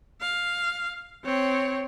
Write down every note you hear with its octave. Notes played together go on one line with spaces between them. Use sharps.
F5
C4 C#5